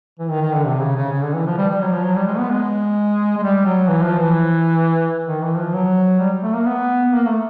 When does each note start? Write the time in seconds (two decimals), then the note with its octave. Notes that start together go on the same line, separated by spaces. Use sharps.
0.19 E3
0.30 D#3
0.42 D#3
0.54 D3
0.65 C3
0.81 C#3
0.96 C#3
1.12 C#3
1.23 D3
1.34 E3
1.47 F3
1.58 G3
1.70 G3
1.81 F#3
1.92 F3
2.04 F#3
2.16 G3
2.27 G#3
2.38 B3
2.51 G#3
3.38 G#3
3.43 G3
3.65 F#3
3.88 E3
4.04 F3
4.19 E3
5.27 D#3
5.43 E3
5.58 F3
5.73 F#3
6.19 G3
6.43 A3
6.54 A#3
6.65 B3
7.13 A#3
7.27 A3